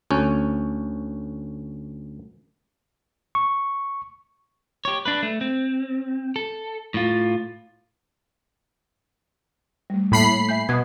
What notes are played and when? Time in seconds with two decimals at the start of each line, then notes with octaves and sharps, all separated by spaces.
0.11 D2 C#4
3.35 C#6
4.85 G4 C#5
5.05 D4 B4
5.23 A3
5.41 C4
6.36 A4
6.94 A2 F4
9.90 G3 A3
10.12 A2 G3 A#3 A5 B5 C7
10.49 E5 G#5 G6
10.69 B2 D#6 G#6